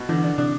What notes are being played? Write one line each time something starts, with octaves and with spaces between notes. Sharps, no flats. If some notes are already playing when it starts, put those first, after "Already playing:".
Already playing: B2
D3 E3
D4
C3 D4